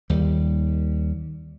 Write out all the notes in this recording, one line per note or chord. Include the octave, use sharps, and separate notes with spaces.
D#2 G3